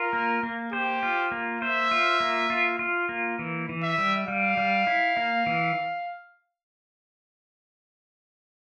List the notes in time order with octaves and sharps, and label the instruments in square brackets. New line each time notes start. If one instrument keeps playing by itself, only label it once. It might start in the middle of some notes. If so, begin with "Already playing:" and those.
Already playing: [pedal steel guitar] F4 [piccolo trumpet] A#4
[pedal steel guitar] A#3
A#3
[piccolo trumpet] G4 [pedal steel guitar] C5
[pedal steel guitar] F4
A#3
[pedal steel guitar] C5 [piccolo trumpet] E5
[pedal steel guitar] F4
A#3
F4
F4
A#3
E3
E3
[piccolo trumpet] E5
[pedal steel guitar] G3
[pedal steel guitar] G3 [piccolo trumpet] F5
[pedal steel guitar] G3
E4
A#3
E3